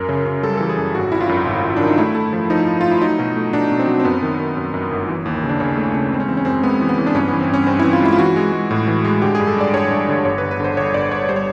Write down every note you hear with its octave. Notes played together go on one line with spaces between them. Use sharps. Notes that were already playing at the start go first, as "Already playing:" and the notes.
Already playing: F#2 A#4
C#3
C#3
G3 A4
E3 A4
G#4
F#2
G#1 F#4
G#1 E4
F4
F#2
G#1
G#1
D#3 D4
D#4
A3 E4
A3
F3
F3 D#4
F3
A3 F4
E4
F#3 D#4
B2
A3
B2 D4
B2
C4
F#3
C4
F#2 B3
D#3
D#3
F#2
F#2
G1
E3
D#2
C#3
D4
C#3 C#4
A3
C#3
G#3 C4
C#4
E3 C4
C#4
F#2 C4
G#3 B3
E3
B3
E3
D4
G2 C#4
B3
E3
C4
G2 C#4
G2 C4
E4
E3
F4
G#3 E4
F4
E3 F#4
G#3
G#3
A2
E3
G#3
D3 G4
G#4
G2
A4
G2 D5
G2 C#5
G2
D3
G1 C#5
B4
G1
B4
D3 C5
G1 C#5
G1 D5
G1 C#5
G3 C5
C#5